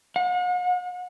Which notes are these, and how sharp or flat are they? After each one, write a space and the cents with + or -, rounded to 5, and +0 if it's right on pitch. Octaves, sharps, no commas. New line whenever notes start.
F#5 -45